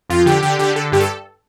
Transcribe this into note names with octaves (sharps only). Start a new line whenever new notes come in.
F2 F4
D3 G4
D3 G4
D3 G4
D3 A4
G2 G4
A4